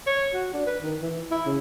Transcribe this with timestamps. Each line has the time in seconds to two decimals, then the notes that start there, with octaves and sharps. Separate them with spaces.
0.07 C#5
0.34 F#4
0.54 D4
0.66 B4
0.81 D#3
1.02 E3
1.31 E4
1.46 C#3